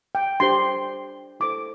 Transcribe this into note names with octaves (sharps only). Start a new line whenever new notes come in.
G5
D4 G4 C5 C6
E4 A4 C5 D6